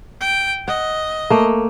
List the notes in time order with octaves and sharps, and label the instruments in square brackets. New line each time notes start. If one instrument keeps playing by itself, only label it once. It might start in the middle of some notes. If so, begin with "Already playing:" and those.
[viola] G5
[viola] D#5 [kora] F#5
[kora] A3 A#3